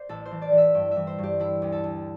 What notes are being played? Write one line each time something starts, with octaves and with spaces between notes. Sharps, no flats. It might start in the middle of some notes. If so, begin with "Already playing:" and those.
Already playing: C5 D5
A1 A4
C5
E3
D5
E3 E5
G2 G5
E3 E5
C5
G2 G4
D3 E4
D2
A4
D2